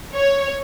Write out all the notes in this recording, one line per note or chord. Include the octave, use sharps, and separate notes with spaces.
C#5